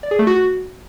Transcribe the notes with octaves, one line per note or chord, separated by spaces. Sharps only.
D5
G#4
A3
F#4